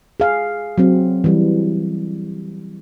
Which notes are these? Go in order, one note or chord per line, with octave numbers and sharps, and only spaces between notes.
G#4 F5
F#3 C4
E3 G3